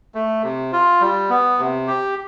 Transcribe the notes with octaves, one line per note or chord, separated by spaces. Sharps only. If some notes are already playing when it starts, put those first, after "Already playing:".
A3
C3
F4
G3
B3
C3
G4